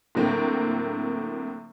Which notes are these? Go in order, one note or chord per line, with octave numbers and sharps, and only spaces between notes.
A2 D3 F#3 A#3 C4